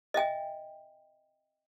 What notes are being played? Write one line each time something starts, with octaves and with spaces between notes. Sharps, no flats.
D#5 E5 G5 G#5